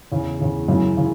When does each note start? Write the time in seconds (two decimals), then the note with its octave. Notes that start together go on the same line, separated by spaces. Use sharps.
0.12 E2 C#3 E3
0.40 E2 C#3 E3
0.68 F#2 C#3 E3
0.97 C#3 E3